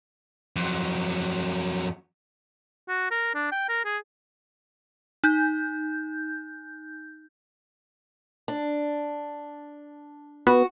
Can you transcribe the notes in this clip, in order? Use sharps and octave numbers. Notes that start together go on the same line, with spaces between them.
F2 F#3
F#4
A#4
D4
G5
A#4
G#4
D#4 G6
D4
B3 F#4